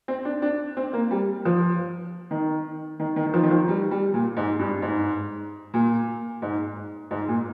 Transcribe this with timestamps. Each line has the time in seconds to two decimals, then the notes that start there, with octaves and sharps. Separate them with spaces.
0.08 C4
0.25 D4
0.42 D4
0.77 C4
0.93 A#3
1.11 G3
1.45 F3
2.31 D#3
3.00 D#3
3.16 D#3
3.26 D#3
3.34 F3
3.43 D#3
3.51 F3
3.68 G3
3.91 G3
4.14 A#2
4.37 G#2
4.59 G2
4.82 G#2
5.74 A#2
6.42 G#2
7.11 G#2
7.28 A#2